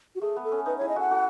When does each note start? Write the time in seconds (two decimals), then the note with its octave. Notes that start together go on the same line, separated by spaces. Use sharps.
0.15 F#4
0.21 A3 G#4
0.36 B3
0.44 A4
0.52 C#4
0.66 D#4 B4
0.78 C#5
0.81 E4 G#4
0.89 D#5
0.96 F#4 A4 F#5
1.11 F#4 A4